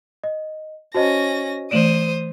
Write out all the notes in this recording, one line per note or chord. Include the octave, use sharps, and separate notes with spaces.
D#5
C#4 F#4 C5 D#5 A5 A#6
E3 A3 C5 D5 D#6 D7 E7 F#7